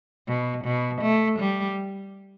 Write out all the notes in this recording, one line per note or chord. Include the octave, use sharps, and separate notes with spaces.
B2
B2
A3
G3